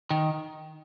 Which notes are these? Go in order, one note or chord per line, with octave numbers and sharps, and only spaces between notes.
D#3